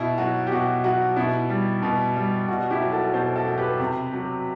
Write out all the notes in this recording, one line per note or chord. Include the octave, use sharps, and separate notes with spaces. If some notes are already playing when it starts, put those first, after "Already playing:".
Already playing: B2 E4
F#3 F#4
G4
B2 F#4
F#3 F#4
B2 E4
G3
B2
G3
B2 F#4
E4 G4
F#3
F#4 A4
B2 A4 C5
F#4 A4
F#3
G4 B4
C3
F#3